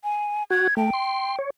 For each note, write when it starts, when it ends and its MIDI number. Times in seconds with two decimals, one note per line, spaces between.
0.04 0.43 80
0.50 0.67 66
0.50 0.74 92
0.77 0.90 57
0.77 1.37 79
0.94 1.36 84
1.39 1.50 73